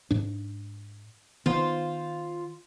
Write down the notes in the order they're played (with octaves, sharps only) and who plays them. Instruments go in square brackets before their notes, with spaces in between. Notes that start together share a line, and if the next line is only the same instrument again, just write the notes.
[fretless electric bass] G#2 D4
[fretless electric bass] D#3 B3 [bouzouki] F4 C5